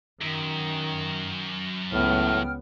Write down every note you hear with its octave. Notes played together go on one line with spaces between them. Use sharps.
F#2 D#3
C#2 A2 B3 F#5 G5 F6